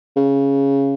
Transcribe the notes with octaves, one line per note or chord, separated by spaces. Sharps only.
C#3